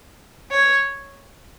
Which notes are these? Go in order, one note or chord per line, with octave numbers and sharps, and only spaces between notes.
C#5